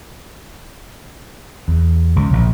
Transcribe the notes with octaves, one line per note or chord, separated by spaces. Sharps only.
E2
C#2
A#1